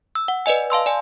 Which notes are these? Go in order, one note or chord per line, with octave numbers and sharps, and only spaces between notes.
E6
F#5
B4 D5 D#5 G#5
F5 A5 C6 E6
D5 G#5